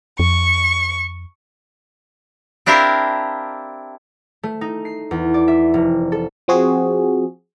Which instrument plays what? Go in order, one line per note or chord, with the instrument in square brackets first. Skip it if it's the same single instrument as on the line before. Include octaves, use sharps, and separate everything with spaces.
[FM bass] F2 [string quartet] C#6
[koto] C4 D4 E4 G4 A#4 F5
[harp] A3
D#4
C7
E2
D5
E5
F1
A4
[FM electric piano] F3 C4 F#4 G#4